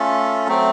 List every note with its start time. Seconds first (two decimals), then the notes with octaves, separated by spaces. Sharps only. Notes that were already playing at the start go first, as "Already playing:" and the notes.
Already playing: A3 C#4 F4 A4
0.47 F#3 A3 C4